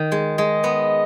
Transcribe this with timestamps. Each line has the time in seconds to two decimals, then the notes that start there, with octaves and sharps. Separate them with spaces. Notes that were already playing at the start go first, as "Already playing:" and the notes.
Already playing: D#3
0.12 G#3
0.38 G#3 D#5
0.64 B3